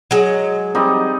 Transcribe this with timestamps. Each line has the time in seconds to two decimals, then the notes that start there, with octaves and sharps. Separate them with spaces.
0.11 F#3 G#3
0.75 G3 C4 D#4